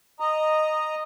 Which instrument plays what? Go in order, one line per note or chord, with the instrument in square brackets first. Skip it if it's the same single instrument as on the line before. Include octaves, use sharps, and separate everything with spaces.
[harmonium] D#5 A#5